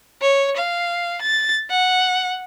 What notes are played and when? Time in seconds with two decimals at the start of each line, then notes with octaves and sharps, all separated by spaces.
0.21 C#5
0.57 F5
1.21 A6
1.70 F#5